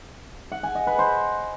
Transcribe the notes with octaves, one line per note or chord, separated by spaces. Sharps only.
F#5
G#5
D#5
B4
C5